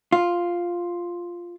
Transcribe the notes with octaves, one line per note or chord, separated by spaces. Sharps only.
F4